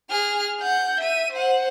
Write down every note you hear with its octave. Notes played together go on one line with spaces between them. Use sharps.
G#4 F6
F#5 G6
E5 D#7
C5 F#5